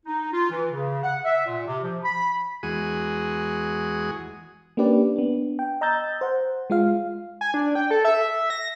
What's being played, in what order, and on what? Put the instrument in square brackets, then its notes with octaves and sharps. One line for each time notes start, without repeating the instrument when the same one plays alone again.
[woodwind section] D#4
F4
E3
C#3
F#5
E5
A#2
C3
F3
B5
[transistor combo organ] E2 G#3 F#4 G#4 D#6
[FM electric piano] A#3 C#4 D4 G4 B4 D5
B3 D4
G5
D#5 A#5 E6 G6 A6
C5 F#5
G#3 F4 F5
[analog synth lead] G#5
D4
G5
A4
E5
A#6